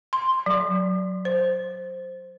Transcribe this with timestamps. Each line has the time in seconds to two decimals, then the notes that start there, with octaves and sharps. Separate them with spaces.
0.13 C6
0.46 F#3
1.25 C5